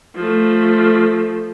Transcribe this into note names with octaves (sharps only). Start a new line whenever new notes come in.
F3 A3